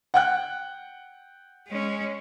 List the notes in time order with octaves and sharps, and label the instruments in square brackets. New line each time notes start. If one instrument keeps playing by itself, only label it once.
[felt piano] F#5 G5 F#6
[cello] G#3 C#4